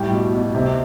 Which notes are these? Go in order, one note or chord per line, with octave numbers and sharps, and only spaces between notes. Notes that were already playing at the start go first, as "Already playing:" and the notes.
Already playing: A2 G3 G5
B2
B2
C3